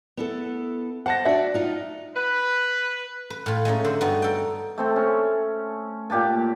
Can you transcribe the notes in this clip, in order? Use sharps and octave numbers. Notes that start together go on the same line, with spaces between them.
B3 E4 A4
C5 F#5 A5 A#6
D4 F#4 D5 E5
D#4 F4
B4
B4
A2 F4
G#3 A3 C#4 D#4
D3 C5
G2 G3 B3 D#4 F#4
A4 G5
A3 C4 A4
C#4
A#2 G4 F#5 A5